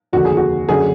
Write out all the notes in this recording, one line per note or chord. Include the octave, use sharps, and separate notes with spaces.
F1 D#2 D3 F#4
G#4
F#4
F#1 F#2 D3 F#3 G#4